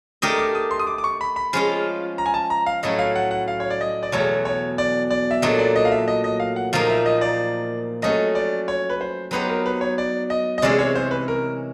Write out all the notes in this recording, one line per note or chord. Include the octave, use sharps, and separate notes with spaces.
A3 D4 G4 A#4 D#5 D#6
D6
D#6
C6
D#6
D6
D6
C#6
B5
B5
F3 G#3 C#4 F4
A#5
G#5
A5
A#5
F5
A2 F#3 A3 C#4 E4 D#5
F5
F#5
F#5
F5
C#5
D5
D#5
D5
E2 B2 F#3 A3 C#5
C#5
D5
D5
E5
A#2 F#3 A3 D4 D#5
D5
D#5
F5
E5
D#5
D#5
F5
F#5
A#2 F3 A#3 D#4 F5
E5
D#5
D5
F#3 A3 C#4 D#5
D5
C#5
B4
C5
F#3 B3 D#4 G4 B4 C5
A#4
B4
C#5
D5
D#5
D#5
C3 E3 G#3 C#4 D5
C#5
C5
B4
A#4